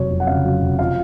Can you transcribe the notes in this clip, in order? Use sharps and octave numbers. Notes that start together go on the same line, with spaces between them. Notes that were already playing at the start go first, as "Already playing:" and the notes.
Already playing: F1 F#3 C#5
F2
F#5
C#3 F5
F#3
F1
F3 F5